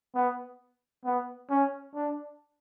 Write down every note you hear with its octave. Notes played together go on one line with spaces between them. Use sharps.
B3
B3
C#4
D4